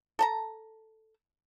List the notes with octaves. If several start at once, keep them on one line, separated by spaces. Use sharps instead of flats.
A4 A5 A#5